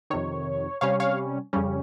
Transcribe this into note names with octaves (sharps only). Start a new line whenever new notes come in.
F2 C3 D#3 C#5
C3 G3 C#4 C#5 F5
C#5 F5
F2 C#3 G3 C#4